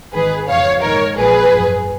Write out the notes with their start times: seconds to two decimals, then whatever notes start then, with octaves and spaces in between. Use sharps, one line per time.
0.13 G#1 G#2 D#3 G#4 B4
0.48 F2 C#3 F3 C#5 F5
0.82 A#1 G#2 D#3 A#4 C#5
1.17 A#1 A#2 F3 G#4 B4
1.52 G#1 F#2 F3